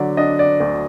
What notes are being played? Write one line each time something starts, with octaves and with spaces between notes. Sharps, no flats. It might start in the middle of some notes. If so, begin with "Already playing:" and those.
Already playing: D3 F#3 D5
D4 D#5
D5
D2